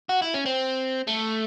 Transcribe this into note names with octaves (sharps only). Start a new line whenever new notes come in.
F#4
E4
C#4
C4
A3